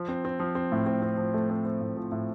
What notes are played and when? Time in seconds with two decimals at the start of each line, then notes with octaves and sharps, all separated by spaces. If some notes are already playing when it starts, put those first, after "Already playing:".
Already playing: F3
0.09 C4
0.25 C4
0.40 F3
0.55 C4
0.72 A2
0.87 C4
1.02 C4
1.18 F3
1.34 A3
1.50 C4
1.65 C4
1.81 A2
1.97 F3
2.12 A2